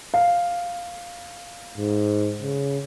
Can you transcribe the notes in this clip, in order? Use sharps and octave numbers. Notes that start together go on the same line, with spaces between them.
F5
G#2
C#3